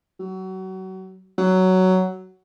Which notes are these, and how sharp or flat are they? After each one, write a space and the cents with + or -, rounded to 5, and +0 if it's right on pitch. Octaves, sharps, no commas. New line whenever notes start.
F#3 +30
F#3 +10